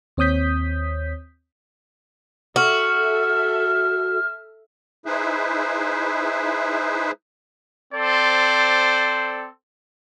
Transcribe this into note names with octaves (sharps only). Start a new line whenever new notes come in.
D#2 C4 C#5 D#6 G6 B6
F#4 A4 E5 F6
D#4 E4 G#4 B4 C5 E5
C4 A4 C5 D5